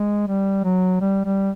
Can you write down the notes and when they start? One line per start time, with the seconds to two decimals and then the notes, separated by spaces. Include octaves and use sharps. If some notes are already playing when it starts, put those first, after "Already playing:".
Already playing: G#3
0.28 G3
0.64 F#3
1.01 G3
1.25 G3